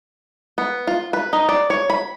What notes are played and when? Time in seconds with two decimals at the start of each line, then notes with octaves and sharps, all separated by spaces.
0.58 B3
0.87 F4
1.13 B4
1.33 D#4
1.49 D5
1.70 C#5
1.90 B5